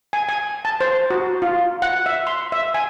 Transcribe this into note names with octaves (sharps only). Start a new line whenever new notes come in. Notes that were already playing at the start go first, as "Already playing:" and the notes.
G#5
G#5
A5
C5
F#4
F4
F#5
E5
C6
E5
G#5